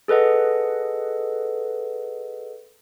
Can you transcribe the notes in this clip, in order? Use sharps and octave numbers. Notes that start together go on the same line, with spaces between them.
G#4 A4 B4 D#5 F#5